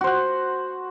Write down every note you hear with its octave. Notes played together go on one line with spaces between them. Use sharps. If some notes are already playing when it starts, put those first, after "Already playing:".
F#4 C5 F#5